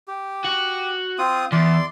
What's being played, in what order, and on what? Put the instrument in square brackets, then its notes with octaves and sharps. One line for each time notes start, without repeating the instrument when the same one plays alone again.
[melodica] G4
[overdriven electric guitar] F#4
[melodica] C4 F4 D#6
[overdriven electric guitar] E2 [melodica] D5 C6